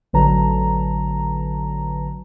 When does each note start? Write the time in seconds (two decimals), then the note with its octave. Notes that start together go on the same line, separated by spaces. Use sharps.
0.13 A1 D3 F#3 B4 A5 A#5